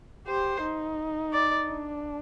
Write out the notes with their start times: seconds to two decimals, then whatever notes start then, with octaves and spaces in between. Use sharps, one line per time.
0.28 G4 C5
0.63 D#4
1.33 D5
1.68 D4